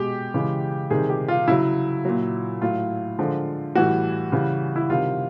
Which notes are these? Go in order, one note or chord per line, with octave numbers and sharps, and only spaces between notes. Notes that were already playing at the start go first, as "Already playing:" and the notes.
Already playing: B2 G#3 G4
C#3 E3 G#3
C3 D#3 G3 G#4
G4
F4
C#3 F#3 E4
A#2 F#3
A2 F#3 F4
D3 F3 G#3
A2 E3 G3 F#4
C#3 E3 G3
E4
C3 D#3 G3 F4